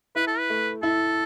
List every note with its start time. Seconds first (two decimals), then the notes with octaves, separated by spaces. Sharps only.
0.16 E4 B4
0.27 A4
0.38 B4
0.50 A3
0.82 E4 A4